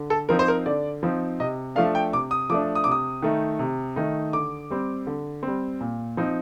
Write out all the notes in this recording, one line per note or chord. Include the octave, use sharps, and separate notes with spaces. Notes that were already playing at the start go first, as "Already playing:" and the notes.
Already playing: D3
A4
F3 C4 D#4 A#4
C5
A#4
D3 D5
F3 C4 D#4
C3 D#5
F3 A3 D4 F5
G5
C3 D6
D#6
F3 A3 D4 D6
D#6
C3 D6
D#6
D#3 A3 D#4
C3
D#3 A3 D#4
D3 D6
G3 C4
D3
G3 C4
A#2
F3 C4 D#4